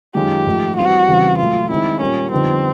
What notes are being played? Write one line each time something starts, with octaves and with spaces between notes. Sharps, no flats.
F#2 D#3 G#3 C#4 F4 G4
G#2 F3 A3
E3 G3 C4 F#4
E2 C#3 E3 G3 C4
A#2 F#3 A3 F4
D#3 G#3 C4 E4
A#2 G3 A#3 C#4
F2 D3 G3 B3 C4 D#4